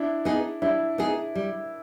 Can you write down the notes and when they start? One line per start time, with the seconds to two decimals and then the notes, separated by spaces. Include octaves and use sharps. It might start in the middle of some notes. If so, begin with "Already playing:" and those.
Already playing: D4 E4
0.25 B3 D#4 G#4
0.62 G3 D4 E4
0.98 B3 D#4 G#4
1.35 G3